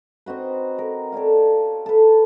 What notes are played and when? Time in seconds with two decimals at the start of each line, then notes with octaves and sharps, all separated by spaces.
0.26 C4 D#4 F#4 B4
0.78 A#4
1.12 A4 C#5 D5 F5
1.86 A4 B4